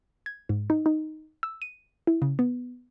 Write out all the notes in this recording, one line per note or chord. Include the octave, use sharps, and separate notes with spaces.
G#6
G#2
D#4
D#4
E6
D#7
E4
C#3
B3